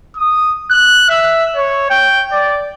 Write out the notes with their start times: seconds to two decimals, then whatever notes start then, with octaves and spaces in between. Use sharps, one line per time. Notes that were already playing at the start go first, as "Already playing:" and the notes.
0.17 D#6
0.71 F#6
1.09 E5
1.56 C#5
1.90 G5
2.32 D5